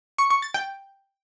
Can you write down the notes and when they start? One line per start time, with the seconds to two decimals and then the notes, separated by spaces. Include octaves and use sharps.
0.18 C#6
0.30 C#6
0.42 A6
0.54 G5